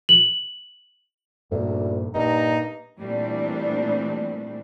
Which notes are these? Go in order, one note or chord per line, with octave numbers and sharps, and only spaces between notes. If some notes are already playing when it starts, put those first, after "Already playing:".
F#7
D2 G2 A#2
G2 A#2 D#4 A#5
A#2 E3 G3 A3 C4 D4